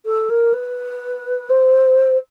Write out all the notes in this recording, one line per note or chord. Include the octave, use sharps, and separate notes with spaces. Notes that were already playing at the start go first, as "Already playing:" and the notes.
A4
A#4
B4
C5